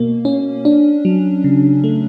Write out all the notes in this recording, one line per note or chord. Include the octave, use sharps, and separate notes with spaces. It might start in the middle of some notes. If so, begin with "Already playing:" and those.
Already playing: B2 A#3
C#4
D4
F#3
C#3
A3